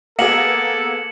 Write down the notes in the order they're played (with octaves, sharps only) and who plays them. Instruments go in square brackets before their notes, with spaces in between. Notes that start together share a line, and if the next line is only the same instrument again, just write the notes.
[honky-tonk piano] A#3 B3 G#4 [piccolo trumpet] A4 [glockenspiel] C#7 E7 F#7